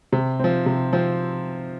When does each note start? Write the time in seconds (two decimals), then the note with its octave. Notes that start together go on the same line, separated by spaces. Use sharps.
0.13 C3
0.39 F3 C4
0.66 C3
0.93 F3 C4